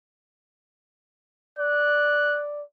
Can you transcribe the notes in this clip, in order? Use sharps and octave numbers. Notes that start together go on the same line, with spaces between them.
D5 F#6